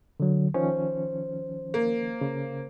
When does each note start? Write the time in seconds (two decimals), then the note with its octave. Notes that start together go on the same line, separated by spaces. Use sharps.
0.20 D3 F#3
0.54 D#3 F3 C#4 C5
1.74 A#3
2.21 C#3